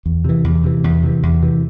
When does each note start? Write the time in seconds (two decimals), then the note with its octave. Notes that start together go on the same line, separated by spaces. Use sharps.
0.06 E2
0.24 C3 E3
0.44 E2
0.64 C3 E3
0.84 E2
1.03 C3 E3
1.23 E2
1.43 C3 E3